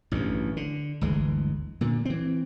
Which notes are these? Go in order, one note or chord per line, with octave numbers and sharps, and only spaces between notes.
A1 D2 G2
D3
G1 D2 E3 G#3
A#2 D3
E3 C4